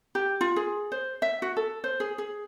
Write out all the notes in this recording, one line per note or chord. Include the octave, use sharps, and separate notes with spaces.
G4
F4
G#4
C5
E5
F#4
A4
C5
G#4
G#4